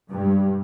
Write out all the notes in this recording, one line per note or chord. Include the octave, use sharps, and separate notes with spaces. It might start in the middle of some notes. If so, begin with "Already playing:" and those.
G2